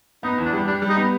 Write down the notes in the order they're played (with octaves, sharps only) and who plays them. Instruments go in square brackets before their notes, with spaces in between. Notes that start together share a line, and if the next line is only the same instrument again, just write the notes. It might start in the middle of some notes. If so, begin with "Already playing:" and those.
[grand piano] B3 [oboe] D#4
[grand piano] E2
[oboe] D4
[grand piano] G3
[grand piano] G3 [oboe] D4
[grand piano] G3
[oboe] D#4
[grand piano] B3